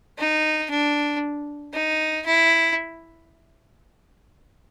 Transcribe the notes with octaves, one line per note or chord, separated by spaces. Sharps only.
D#4
D4
D#4
E4